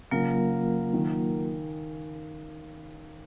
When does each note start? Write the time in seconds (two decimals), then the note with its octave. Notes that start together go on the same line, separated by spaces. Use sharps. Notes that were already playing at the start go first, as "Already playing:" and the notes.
0.11 C#3 F#3 A#3 F4 A#4
0.93 D#3